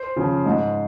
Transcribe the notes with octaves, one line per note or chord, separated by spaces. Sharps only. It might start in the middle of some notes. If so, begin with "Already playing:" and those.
Already playing: C5
C#3 F3
G#2